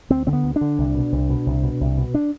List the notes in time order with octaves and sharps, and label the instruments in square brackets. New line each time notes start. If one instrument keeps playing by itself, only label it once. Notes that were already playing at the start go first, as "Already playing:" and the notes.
[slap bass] D2 C4
D3 C4
B3
D2
D4
D3
C2
B2
C2
B2
C2
B2
C2
B2
D4